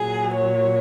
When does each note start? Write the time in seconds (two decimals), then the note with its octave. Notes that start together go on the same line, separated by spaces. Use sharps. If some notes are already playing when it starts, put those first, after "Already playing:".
Already playing: A#2 F#3 G#4
0.37 C#5